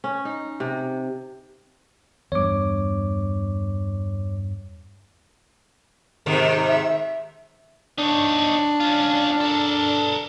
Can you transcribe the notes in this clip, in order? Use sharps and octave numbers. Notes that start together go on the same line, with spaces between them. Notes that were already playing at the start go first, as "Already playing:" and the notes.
C#4
D#4
C3
E2 G2 C#5 D6
G#2 C3 D#3
E5
D4 D#4 C#5
C#4 F4
A4 A#4